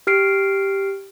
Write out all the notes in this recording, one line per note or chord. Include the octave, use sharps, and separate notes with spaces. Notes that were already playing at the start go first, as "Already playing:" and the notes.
G4 F6 C7 D7